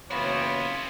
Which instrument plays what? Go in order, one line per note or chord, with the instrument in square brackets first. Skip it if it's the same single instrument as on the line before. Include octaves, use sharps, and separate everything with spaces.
[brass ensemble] F#1 E3 C#5 [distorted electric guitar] B1 C4 [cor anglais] B3 [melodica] F4 B5